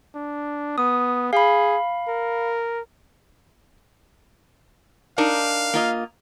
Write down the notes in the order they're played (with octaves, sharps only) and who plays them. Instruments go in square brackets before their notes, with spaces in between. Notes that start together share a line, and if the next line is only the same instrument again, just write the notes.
[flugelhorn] D4
[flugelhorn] B3 [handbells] D#6
[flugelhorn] G#4 [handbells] F5 B5
[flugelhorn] A#4
[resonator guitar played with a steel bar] D4 D#4 A#4 [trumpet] F5
[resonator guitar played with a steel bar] A#3 F4 D#5